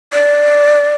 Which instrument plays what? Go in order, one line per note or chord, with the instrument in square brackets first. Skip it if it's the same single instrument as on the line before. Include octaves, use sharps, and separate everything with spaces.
[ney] D5